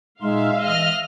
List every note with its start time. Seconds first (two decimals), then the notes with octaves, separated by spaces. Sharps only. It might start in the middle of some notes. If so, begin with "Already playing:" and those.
0.22 A#2 G#3 D#4 E5 F5 C6
0.64 E3 D#5 F6